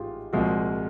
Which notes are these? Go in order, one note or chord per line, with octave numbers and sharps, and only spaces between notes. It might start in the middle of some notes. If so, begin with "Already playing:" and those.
Already playing: A1 G#2 F4 G4 G#4
C2 A#2 F3 G#3 F#4 G#4